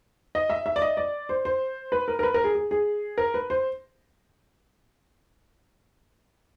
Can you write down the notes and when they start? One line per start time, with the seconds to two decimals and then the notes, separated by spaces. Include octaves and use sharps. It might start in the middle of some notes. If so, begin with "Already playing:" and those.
0.35 D#5
0.50 E5
0.66 E5
0.76 D5
0.82 D#5
0.97 D5
1.29 C5
1.45 C5
1.92 B4
2.08 A#4
2.19 A#4
2.23 B4
2.34 A#4
2.44 G#4
2.55 G#4
2.71 G#4
3.18 A#4
3.34 B4
3.50 C5